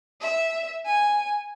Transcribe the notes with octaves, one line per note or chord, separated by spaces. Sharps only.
E5
G#5